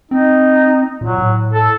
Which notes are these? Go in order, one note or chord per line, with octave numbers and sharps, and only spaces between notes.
C4 D#4
A#2 F#3
A2
A4